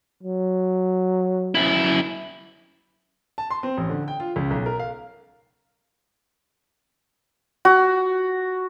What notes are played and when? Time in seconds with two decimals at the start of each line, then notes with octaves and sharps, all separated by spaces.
0.23 F#3
1.55 F#2 E4
3.38 A5
3.50 C6
3.63 C4
3.77 A1
3.89 D3
4.08 G5
4.20 F4
4.36 C#2
4.50 B1
4.66 A#4
4.79 F5
7.65 F#4